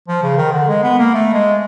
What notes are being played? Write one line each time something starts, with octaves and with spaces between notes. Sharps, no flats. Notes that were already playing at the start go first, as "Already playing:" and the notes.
F3
C#3
D#3
D3
G#3
B3
A#3
A3
G#3